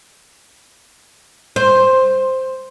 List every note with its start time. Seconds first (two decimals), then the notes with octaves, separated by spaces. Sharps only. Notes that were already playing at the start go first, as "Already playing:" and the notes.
1.56 C5